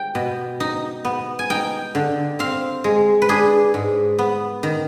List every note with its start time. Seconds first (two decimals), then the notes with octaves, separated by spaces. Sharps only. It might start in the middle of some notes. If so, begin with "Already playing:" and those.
Already playing: G5
0.15 B2
0.60 D#4
1.05 B3
1.39 G#5
1.50 D#4 G5
1.95 D3
2.39 C4 F5
2.84 G#3
3.22 B4
3.29 D4 G#4
3.74 G#2
4.19 B3
4.63 D#3